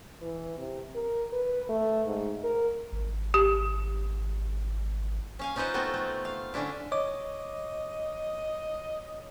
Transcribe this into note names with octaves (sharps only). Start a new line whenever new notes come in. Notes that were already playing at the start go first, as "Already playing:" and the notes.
E3
C3
A#4
B4
A3
G#2
A#4
G#1
G4
C#4 F5 G#5
C#4 D#4 F4 B4 C5 F#5
A3 B3 C4 F4 F#4 A4
A3
F5
D3 C#4 D4 E4
C#5 D#5 D6